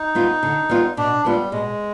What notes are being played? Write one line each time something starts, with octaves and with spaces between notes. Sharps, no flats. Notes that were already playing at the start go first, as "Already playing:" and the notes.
Already playing: D#4
G3 B3 F4
D3
G3 B3 F4
B2 D4
G3 G#3 B3 F4
B2 G#3